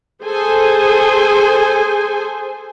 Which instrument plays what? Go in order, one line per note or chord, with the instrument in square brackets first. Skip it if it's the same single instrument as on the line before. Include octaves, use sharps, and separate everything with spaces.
[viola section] G#4 A4 C5 G#5